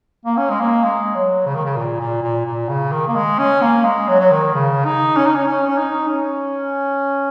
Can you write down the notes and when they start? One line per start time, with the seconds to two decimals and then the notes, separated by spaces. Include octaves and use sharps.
0.26 A#3
0.37 C#4
0.50 G#3
0.61 A#3
0.84 G#3
1.15 F#3
1.46 C#3
1.55 D#3
1.65 C#3
1.77 A#2
2.00 A#2
2.23 A#2
2.46 A#2
2.69 C#3
2.92 D#3
3.08 A#3
3.16 G#3
3.39 C#4
3.62 A#3
3.85 G#3
4.08 F#3
4.20 F#3
4.31 D#3
4.54 C#3
4.85 D#4
5.17 C#4
5.26 D#4
5.36 C#4
5.47 C#4
5.67 C#4
5.78 D#4
6.08 C#4